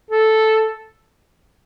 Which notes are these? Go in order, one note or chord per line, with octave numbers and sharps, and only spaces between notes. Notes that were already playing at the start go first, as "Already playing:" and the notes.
A4